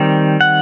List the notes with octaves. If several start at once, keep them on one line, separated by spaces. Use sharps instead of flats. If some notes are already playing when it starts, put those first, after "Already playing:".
Already playing: D#3 G3 C4
F#5